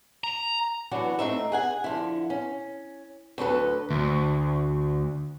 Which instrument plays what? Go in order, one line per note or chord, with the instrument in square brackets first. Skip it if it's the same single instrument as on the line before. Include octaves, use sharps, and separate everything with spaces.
[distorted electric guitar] A#5
[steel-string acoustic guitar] E3 F#3 B3 D4 F#4
A3 C4 D#4 E5
G#4 F#5 G#5
D3 F3 E4
C#4
D2 F#3 A4 B4
[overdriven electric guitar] D2